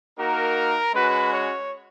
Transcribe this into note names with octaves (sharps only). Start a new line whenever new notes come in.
A#3 D#4 F#4 A#4
G#3 C#4 F#4 B4
C#5